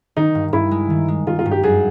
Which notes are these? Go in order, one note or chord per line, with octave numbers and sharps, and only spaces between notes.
D#3 D#4
G2
G2 E4
G#3
D#3
G#3
D#3 F4
F4
G2
G4
F#2 G#4